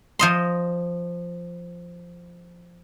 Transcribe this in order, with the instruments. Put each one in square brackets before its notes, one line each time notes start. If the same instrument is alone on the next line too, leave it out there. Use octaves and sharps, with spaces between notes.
[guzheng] F3 D#5 C6